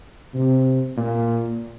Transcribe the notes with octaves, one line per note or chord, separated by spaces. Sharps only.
C3
A#2